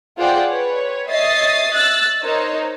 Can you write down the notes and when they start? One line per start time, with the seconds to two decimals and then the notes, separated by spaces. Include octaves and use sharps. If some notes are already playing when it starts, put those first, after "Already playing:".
0.17 F4 G#4 C5 D5 F#5 G5
0.48 B4 C#5
1.10 C#5 D#5 E5 D#6 A6 C7
1.73 E6 F#6 A6
2.21 D#4 A#4 C5 C#5 D#5